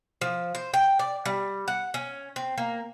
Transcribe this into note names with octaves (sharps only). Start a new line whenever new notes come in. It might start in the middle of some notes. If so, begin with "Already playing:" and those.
F3
C5
G5
D5
G3
F#5
C#4
C4
A#3